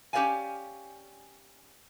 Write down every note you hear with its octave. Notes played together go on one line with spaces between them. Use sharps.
C#4 G4 B4 D5 F5 G#5